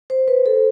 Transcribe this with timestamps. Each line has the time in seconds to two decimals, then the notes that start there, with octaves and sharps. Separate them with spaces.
0.10 C5
0.28 B4
0.46 A4